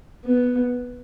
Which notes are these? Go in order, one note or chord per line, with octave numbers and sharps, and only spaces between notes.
B3